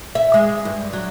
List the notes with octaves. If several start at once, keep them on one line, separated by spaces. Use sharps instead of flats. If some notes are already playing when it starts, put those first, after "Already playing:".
E5
G#3
G2
F#3